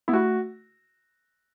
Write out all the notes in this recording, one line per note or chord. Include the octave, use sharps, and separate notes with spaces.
B3 E4
A3 F#4